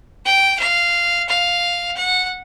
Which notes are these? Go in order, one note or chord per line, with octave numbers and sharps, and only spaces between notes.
G5
F5
F5
F#5